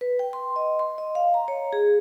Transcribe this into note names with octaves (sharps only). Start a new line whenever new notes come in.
B4
G5
C6
D#5
C6
D#5
F5
A#5
C#5
G#4